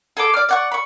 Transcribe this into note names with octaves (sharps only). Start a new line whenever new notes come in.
G#4 A4 D6
D5 F6
D5 F#5 C#6
B5 C#6